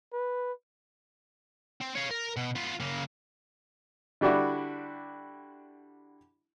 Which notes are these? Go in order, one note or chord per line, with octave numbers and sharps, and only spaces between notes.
B4
C4
C#5 F5
A#4
B2
B3 F4
C#3 A#3
D3 G3 D4 E4 F#4